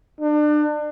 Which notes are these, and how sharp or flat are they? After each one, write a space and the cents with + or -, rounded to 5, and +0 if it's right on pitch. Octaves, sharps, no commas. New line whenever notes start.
D4 +35